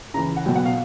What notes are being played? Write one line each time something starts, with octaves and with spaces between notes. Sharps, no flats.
C#3 E3 A#5
F#5
B2 F#3 G5
F#5
F5